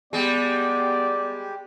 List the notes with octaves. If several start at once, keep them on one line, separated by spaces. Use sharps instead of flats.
G3 G#3 B3 G4 D5